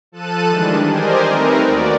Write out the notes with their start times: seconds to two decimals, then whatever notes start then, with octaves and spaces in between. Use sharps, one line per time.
0.12 F3 A4 A5 F#6 D#7
0.49 D#3 E3 G3 G#3 D4
0.86 G4 A#4 C5 D5 D#5 G#5
1.26 A3 C4 D#4 A#4 B4
1.65 D#2 F#4 D5